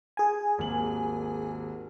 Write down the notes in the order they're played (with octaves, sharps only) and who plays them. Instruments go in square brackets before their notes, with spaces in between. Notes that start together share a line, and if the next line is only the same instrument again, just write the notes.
[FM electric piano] G#4 G#5
[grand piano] G#1 D#2 F#7